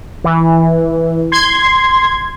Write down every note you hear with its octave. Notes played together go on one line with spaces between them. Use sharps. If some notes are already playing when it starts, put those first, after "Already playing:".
E3
C6 G#6